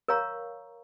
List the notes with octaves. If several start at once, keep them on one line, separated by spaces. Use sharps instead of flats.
A#4 C#5 F5 A#5 C#6